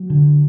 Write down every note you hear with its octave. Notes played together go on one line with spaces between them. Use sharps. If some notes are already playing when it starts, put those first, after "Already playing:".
Already playing: F#3
D3